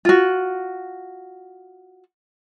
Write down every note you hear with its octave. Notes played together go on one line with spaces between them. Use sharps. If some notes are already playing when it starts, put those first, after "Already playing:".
F4 F#4